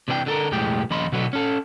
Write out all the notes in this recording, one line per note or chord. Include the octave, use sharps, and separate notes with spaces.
C3 E3 D4 A4 G5
D3 A4 A#4
B1 F2 A2 G#3 G4 G5
D#2 C#3 F3 D#5 B5 C6
B2 D3 F#3 B3
C#4 A4